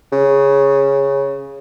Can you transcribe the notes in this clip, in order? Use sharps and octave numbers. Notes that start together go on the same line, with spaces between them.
C#3